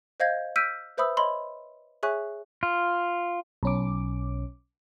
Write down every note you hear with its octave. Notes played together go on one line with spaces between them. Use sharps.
C5 D#5 F5 G6 G#6 A#6
E6 F6 G6 B6 D7 D#7
B4 C5 E5 B5 D#6 E6
C#5 D#5 B5 C6
G#4 C#5 E5 G#5 C#6 F#6
F4
B1 C#4 D6